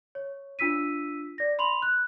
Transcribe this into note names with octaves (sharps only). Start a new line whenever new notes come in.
C#5
D4 F4 E6 B6 D#7
D5 A#6
B5 C6 F7 F#7
F#6